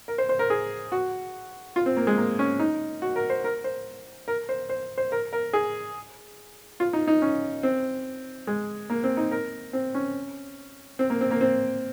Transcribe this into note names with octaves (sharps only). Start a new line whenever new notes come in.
A#4
C5
C5
A#4
G#4
F#4
F4
C4
A#3
G#3
A#3
C#4
D#4
F#4
A#4
C5
A#4
C5
A#4
C5
C5
C5
A#4
A#4
G#4
F4
D#4
D#4
C#4
C4
G#3
A#3
C4
D#4
A#4
C4
C#4
C4
A#3
C4
A#3
C4